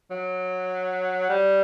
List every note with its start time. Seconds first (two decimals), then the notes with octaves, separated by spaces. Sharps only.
0.11 F#3
1.29 G3